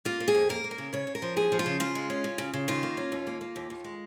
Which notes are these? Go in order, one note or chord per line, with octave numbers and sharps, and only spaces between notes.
A#3 F4
A#3
G#4
F2
A#3 A#4
A#3
A#4
C#3
C#3 C#5
C#3
A#4
F3
D#2 G#4
F3
F4
C#3
C#3 F4
G#3
C#4
C#3
C#3
C#3
D#3 F4
A#3
C#4
D#2
A#3
A#3
D#2
D#2
G#3